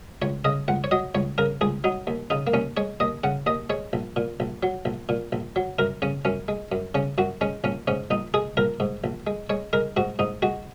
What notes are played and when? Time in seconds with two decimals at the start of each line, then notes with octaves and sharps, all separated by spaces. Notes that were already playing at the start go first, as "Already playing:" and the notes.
0.22 C#2 C#5
0.45 C#3 D#5
0.68 C#2 F#5
0.84 C#5
0.91 F#3 D#5
1.15 C#2 C#5
1.38 C#3 A#4
1.61 C#2 G#4
1.84 F#3 D#4
2.07 D#2
2.30 C#3 D#4
2.47 A#3
2.54 D#2 C#4
2.77 G#3 C#5
3.00 D#2 D#5
3.24 C#3 F#5
3.46 D#2 D#5
3.70 G#3 C#5
3.93 A#1
4.16 A#2
4.40 A#1
4.63 F#3
4.85 A#1
5.09 A#2
5.32 A#1
5.56 F#3
5.79 F#2 A#4
6.02 C#3 C#4
6.25 F#2 C#4
6.48 G#3
6.72 F#2
6.95 C#3 C#4
7.18 F#2 F#4
7.41 G#3 C#4
7.64 A#1 C#4
7.87 G#2 C#4
8.11 A#1 D#4
8.34 G#3 G#4
8.57 A#1 A#4
8.80 G#2
9.04 A#1
9.27 G#3
9.50 G#3 C#5
9.73 G#3 A#4
9.97 G#2 F#4
10.19 G#2 D#4
10.42 G#3 F#4